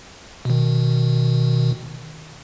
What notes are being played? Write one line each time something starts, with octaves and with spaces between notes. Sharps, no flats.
B2 D#3